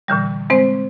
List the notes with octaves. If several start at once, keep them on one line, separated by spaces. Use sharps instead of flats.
A#2 D3 E3 G3
G#3 C4 C5